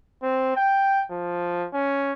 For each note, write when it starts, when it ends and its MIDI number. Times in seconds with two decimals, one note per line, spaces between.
0.23 0.52 60
0.56 1.02 79
1.11 1.67 53
1.73 2.13 61